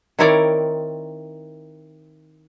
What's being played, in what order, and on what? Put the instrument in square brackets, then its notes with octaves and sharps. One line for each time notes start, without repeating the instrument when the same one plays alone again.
[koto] D#3 C4 E4 A#4 C#5 D5